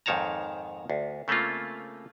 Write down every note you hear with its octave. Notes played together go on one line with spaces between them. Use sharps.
F2 G#2 D#3 C#5 A5 A#5
D2
C#3 A3 A#3 C4 F4